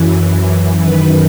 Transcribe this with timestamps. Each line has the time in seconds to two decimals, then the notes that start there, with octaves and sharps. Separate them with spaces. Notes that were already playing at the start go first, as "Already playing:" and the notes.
Already playing: F#2 E3
0.82 F#2 D#3 B4